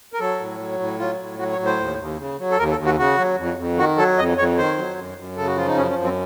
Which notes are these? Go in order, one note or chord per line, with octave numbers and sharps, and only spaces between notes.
A#4
F#3 A4
A2
F#3
A2
F#3 F4
A2
F#3 F#4
C#5
A2
C5
D#2
D#2
C#3
F#3
A4
D#2 A#4
A4
D#2
F#4
C#3 F#4
F#3
F2
F2
D#3 F#4
F#3 A4
F2 D#5
F2 C#5
D#3 C5
F#3
F#2
F#2
C#3 A4
F#4
F3 F4
D#4
F#2 C#4
C#4
F#2
C4